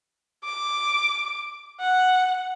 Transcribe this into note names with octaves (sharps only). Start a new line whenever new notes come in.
D6
F#5